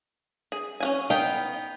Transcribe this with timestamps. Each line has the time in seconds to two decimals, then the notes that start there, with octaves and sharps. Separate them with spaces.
0.52 G#4
0.80 C#4 F#4 G#5
1.10 B3 D#4 F5 G5